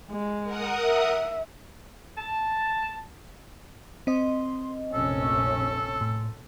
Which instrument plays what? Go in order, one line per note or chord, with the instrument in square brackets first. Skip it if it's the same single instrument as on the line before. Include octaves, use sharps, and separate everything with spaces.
[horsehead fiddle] G#3
[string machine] A#4 F#5 D#6
[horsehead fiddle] E5
[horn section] A5
[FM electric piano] C4 D#5 [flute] C6
[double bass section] F1 A#1 C#4 [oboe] A4 [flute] E6
[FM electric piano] A2